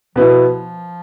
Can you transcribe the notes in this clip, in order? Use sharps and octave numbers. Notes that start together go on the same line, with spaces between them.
B2 F3 B3 E4 B4